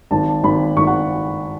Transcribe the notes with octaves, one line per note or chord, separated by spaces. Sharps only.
G#1 A5
G#1 B5
G#1 C#6
F#5